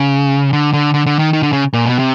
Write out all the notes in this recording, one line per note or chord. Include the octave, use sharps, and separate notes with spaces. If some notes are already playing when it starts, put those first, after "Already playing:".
Already playing: C#3
D3
D3
D3
D3
D#3
D#3
D3
C#3
A#2
B2
C3